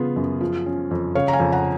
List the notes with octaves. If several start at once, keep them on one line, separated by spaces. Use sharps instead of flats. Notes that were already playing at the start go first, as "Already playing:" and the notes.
Already playing: C#3 B3 F4 G#4
F#2
F3
C#4
F2
C#3 C#5 F5
A#5
F5 G#5
F2
F#5 A#5